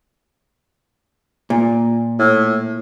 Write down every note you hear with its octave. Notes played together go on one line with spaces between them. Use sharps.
A#2
A2